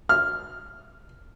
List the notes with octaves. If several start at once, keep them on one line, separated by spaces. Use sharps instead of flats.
F6